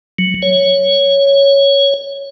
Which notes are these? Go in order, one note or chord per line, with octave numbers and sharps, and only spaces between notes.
F#3
C#5